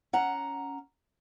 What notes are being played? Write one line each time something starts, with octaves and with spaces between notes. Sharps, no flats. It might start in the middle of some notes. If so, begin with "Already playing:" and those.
C#4 F#5 A#5